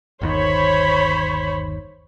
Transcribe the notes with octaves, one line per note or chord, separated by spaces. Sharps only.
G1 D#2 D#3 C5 C#5 B5